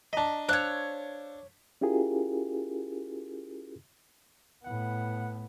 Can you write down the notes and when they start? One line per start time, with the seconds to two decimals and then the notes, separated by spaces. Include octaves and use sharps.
0.13 D4 D#5 A5 A#5 B6
0.49 D4 C5 C#5 F5 E6 F#6
1.81 C#4 E4 F4 G4 G#4 A#4
4.65 A2 B3 F#5